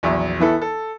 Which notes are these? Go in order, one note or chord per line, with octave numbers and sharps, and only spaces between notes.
A#1 E2 F#3 E5
E3 B3 E4 A4
A4